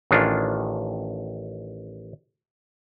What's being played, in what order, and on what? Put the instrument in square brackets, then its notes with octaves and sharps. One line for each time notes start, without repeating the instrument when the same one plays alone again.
[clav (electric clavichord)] A1 D#3 C#4 D4 F4